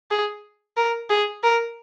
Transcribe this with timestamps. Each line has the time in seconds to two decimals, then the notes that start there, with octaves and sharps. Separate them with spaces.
0.11 G#4
0.77 A#4
1.10 G#4
1.43 A#4